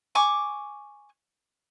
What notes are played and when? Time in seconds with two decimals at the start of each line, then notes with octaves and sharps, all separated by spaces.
0.15 G#5 C#6 D6